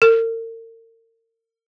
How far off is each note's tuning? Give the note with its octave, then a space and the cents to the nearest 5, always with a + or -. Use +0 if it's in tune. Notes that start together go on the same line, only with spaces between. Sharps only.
A#4 -40